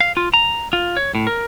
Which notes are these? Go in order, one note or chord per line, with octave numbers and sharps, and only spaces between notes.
F5
F4
A#5
F4
C#5
A2
A#4